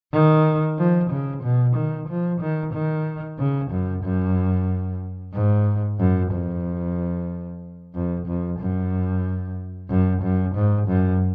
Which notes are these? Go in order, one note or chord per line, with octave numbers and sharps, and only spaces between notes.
D#3
F3
C#3
B2
D#3
F3
D#3
D#3
C#3
F#2
F#2
G#2
F#2
F2
F2
F2
F#2
F#2
F#2
G#2
F#2